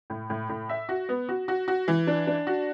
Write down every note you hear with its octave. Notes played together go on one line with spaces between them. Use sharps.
A2
A2
A2
E5
F#4
B3
F#4
F#4
F#4
E3
D4
D4
F#4